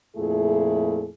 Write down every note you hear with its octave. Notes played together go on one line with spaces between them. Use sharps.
F2 A#2 A3 E4 G#4